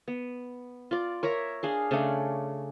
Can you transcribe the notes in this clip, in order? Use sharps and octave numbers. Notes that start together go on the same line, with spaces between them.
B3
F4 D5
A#4 C#5 E5 A#5
D4 G#4 F5
C#3 A3 C#4 D4